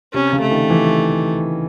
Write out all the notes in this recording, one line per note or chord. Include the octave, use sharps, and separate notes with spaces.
C3 C#4
C#3
A3
D#3
E3